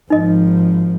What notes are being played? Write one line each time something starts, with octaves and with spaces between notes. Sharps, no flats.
G#1 F3 D#4 D#5